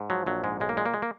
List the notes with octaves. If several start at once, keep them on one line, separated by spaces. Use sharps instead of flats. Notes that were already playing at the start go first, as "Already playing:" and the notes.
Already playing: G#2
F3 F#3
A#1 F#3
G#2 G#3
B1 G#3
A#3
A#2 G#3
A#3
G#3
A#3